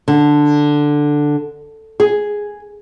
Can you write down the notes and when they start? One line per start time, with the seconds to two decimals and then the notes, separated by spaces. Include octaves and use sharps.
0.08 D3
2.00 G#4